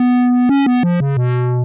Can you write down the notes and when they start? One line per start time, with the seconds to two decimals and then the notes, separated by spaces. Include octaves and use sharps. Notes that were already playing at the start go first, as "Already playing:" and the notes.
Already playing: B3
0.49 C#4
0.66 B3
0.83 F3
1.00 C#3
1.17 B2